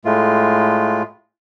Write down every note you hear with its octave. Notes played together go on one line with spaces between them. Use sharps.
A2 G#3 A3 F4